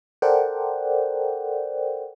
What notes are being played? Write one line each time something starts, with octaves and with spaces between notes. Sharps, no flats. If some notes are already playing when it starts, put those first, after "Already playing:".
A4 A#4 C5 D5 F#5 G5